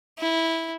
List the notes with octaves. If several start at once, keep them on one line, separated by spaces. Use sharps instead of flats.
E4